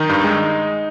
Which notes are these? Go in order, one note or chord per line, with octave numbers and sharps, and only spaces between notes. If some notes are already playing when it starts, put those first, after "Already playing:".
Already playing: D#3 D#4
G2
G#3